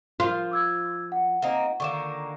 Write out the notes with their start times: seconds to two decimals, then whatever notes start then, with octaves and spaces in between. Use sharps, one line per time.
0.20 F3 F4 A#4 C6
0.51 D6 E6 G#6
1.12 F#5
1.42 A#3 C4 D#4
1.80 D3 D#3 A#3 C#6 D6 E7